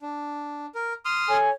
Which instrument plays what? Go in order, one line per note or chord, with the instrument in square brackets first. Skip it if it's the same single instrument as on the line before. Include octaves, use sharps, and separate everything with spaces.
[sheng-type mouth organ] D4
A#4
C6 D#6 F6
[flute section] A4 C#5 G#5